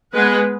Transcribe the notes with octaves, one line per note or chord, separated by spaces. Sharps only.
G#3 B3 G#4 B4